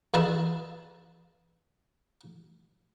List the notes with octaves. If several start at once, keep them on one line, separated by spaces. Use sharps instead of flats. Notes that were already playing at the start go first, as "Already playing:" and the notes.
E2 G#4 B4 E5 A5 B5